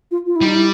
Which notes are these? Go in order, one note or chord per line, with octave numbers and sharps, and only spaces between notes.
F4
F4
E4
G3 D#4
E4